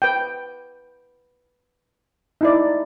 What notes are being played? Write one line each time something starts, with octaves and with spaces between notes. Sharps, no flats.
B4 G5
D#4 E4 D5